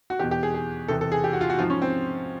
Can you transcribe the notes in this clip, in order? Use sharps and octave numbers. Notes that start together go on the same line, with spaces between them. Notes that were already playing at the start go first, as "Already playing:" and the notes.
F#4
E2 B2 G4
G4
G#4
G#4
E2 C3 E3 A4
A4
G#4
G4
F#4
F4
F#4
G#2 F3 F4
C#4
C4